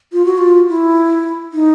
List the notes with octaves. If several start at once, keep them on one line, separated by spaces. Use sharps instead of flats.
F4
F#4
F4
E4
D#4